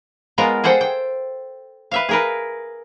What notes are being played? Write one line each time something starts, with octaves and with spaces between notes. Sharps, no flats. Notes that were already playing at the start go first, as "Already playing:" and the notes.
G#3 B3 F4 A#4
G#4 A4 C5 F#5 G5
G5
B4 E5 F5
G#4 A#4 B4